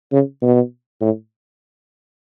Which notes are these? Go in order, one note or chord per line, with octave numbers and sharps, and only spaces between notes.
C#3
B2
A2